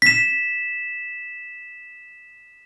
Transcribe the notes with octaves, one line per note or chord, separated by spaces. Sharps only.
B6 E7